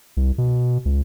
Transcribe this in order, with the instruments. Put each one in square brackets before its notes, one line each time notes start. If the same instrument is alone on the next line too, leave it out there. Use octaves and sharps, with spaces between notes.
[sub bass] C2
B2
C#2